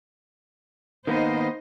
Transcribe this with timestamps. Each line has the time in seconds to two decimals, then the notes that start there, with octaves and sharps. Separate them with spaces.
1.07 D#3 A#3 B3 D#4 C5 D#5